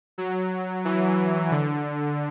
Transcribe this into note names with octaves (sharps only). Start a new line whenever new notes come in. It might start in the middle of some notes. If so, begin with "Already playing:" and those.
F#3
E3
D3